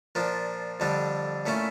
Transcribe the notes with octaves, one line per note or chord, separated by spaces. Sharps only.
A#2 F3 A#3 D4
F2 D3 G3 D4
A#2 A3 C#4 E4